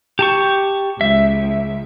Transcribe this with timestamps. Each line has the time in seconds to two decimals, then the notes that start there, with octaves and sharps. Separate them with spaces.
0.19 G4 A5 C#6
1.01 C#2 E5